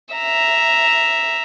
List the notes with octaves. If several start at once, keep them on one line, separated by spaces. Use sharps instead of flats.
E5 A#5